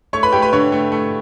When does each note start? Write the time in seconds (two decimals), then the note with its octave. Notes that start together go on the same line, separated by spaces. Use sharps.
0.13 A3 C#5 C#6
0.23 B4 B5
0.33 A3 G4 G5
0.42 B4 B5
0.53 D3 C#5 C#6
0.72 A3
0.92 A3